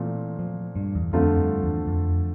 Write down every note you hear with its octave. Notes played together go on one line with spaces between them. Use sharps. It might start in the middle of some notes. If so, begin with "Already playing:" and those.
Already playing: A#2 E3 A3 C4 F4
F3
G2
E2
F2 D3 F3 A3 C4 F4
G2
E2
F2